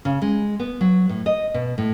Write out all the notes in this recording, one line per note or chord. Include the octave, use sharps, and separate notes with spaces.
C#3
G#3
B3
F#3
A2
D#5
B2
A2